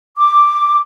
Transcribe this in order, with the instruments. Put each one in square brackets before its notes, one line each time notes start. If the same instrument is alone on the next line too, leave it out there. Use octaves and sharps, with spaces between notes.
[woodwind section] D6